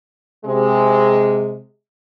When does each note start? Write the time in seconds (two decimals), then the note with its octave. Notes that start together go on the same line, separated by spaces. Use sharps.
0.45 C3 G#3